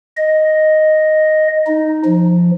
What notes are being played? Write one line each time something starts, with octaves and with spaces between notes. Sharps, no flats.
D#5
D#4
F3